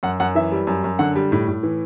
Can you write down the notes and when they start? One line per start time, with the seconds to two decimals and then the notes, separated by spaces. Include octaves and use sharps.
0.03 F#2 F#5
0.20 F#2 F#5
0.35 E3 E5
0.52 G3
0.67 F#2
0.84 F#2
0.99 D3 F#5
1.16 G3
1.32 A2
1.48 A2
1.63 E3